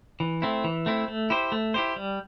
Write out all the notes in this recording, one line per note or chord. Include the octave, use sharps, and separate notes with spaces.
E3
A3 C4 E4
E3
A3 C4 E4
A3
E4 G4 C5
A3
E4 G4 C5
G3